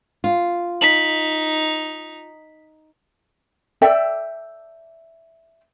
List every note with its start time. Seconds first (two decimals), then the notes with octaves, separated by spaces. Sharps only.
0.24 F4
0.81 D#4 B6 F#7
3.82 A4 D5 E5 G5